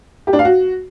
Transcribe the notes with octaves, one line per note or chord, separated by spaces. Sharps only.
G4
D4
F5
F#4